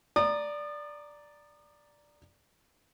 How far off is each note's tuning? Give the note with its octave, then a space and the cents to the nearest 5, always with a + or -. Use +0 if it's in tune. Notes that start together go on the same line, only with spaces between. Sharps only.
D5 +0 A#5 -5 D#6 -35